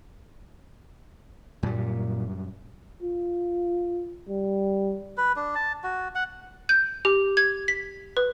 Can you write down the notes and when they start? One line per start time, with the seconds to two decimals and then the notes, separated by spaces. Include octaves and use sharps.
1.63 F#2 A#2 G3
3.02 F4
4.29 G3
5.17 B4
5.36 D4
5.55 A5
5.84 F#4
6.15 F#5
6.69 G6
7.05 G4
7.37 G#6
7.68 B6
8.17 B4